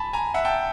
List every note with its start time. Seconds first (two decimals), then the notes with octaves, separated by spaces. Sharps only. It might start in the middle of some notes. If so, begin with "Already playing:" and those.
Already playing: G#5 A5 B5
0.13 G#5 A#5
0.34 E5 F#5
0.45 G5 A5